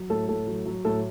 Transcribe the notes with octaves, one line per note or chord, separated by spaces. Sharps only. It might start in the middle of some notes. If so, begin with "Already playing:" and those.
Already playing: F#3
A2 A4
A2 A4
F#3
F#3
A2 A4